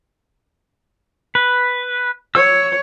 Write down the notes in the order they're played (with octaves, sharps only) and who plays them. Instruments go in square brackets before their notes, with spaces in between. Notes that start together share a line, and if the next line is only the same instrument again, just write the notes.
[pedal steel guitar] B4
[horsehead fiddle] C#5 [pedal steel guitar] E6